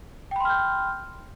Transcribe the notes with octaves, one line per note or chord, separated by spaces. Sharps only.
G5 B5 C6 F6 G6